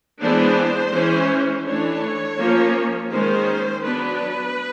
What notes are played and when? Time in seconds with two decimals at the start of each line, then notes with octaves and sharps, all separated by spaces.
0.20 E3 G#3 B3 D4 C5
0.93 E3 G#3 C#4
1.65 E3 A3 D4 C#5
2.38 F3 A#3 C#4
3.10 D#3 G#3 C#4 C5
3.83 F#3 B3 D4 B4